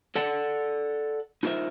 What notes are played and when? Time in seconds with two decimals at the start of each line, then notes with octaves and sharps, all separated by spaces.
0.16 A4 D5 F#5 A5
1.43 D#4 F4 A#4 C5 E5